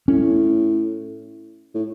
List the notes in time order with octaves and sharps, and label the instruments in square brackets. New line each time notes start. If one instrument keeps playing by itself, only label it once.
[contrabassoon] A2 [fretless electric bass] C#4
[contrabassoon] A2